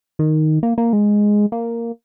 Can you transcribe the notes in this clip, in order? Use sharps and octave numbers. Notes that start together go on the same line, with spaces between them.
D#3
A#3
A#3
G#3
A#3